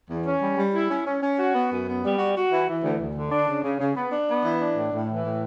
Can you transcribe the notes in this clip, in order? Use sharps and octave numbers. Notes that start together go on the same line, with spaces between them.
E2
C#4
G3
G3
E4
C#4
C#4
C#4
F#4
B3
F#2
B3
G3
F#4
F#4
E3
E3
D2
D2
D3
D4
C#3
C#3
C#3
B3
D4
B3
E3
D4
A2
A2
E3
A2